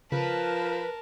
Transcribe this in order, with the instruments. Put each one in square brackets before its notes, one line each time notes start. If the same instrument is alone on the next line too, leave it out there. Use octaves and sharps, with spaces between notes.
[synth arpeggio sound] C#3 [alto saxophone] F3 [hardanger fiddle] A#4 A5 [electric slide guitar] B4